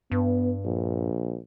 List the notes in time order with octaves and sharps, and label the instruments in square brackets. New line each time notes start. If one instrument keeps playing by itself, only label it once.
[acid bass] G2 [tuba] B3
[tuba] A#1